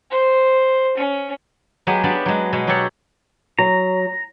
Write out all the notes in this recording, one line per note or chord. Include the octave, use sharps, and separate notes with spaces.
C5
C#4
F#3 G#3 B3 G4 G#4
B3 D4 G4 D5 F5
F#3 G#3
B2 G#3
F#3 F#4 G4 A4 C#5 F#5
F#3 A#5